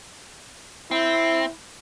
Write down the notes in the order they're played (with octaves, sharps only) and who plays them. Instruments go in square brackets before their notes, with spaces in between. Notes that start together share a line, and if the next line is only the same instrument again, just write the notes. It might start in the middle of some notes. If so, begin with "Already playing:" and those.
[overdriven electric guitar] C4 [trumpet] E4